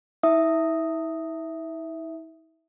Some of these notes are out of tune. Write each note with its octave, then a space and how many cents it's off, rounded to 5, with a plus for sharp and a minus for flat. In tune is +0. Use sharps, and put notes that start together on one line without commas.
E4 -45 E5 +0 D#6 +0